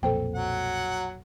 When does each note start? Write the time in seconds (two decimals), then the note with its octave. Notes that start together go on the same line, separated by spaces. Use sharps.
0.03 B1 F2 A#2 A4 C5 G5
0.35 F#3 F#5